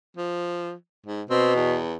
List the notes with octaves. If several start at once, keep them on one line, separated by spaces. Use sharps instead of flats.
F3
G#2
B2 C4
E2